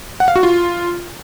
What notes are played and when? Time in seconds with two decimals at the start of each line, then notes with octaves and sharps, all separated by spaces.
0.20 F#5
0.28 F5
0.36 F#4
0.43 F4